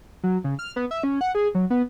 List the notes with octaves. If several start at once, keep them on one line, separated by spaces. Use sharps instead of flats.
F#3
C#3
F6
B3
E5
C#4
F#5
G#4
F#3
B3